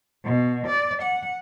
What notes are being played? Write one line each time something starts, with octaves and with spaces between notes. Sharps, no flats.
B2
D5
F#5